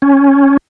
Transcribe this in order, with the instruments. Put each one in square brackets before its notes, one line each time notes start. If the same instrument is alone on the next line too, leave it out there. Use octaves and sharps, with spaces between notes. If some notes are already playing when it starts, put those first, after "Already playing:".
[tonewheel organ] C#4